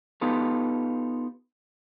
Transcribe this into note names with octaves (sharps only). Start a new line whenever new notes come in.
B3 D#4 F4 G4 A4